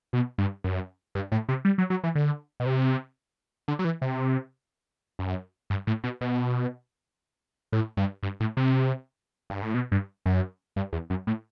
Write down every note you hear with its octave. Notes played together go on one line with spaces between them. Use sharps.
B2
G2
F#2
G2
A2
C3
G3
F#3
F#3
E3
D3
B2
C3
D3
F#3
E3
C3
F#2
G2
A2
B2
B2
A2
G2
G2
A2
C3
G2
A2
B2
G2
F#2
G2
E2
F#2
A2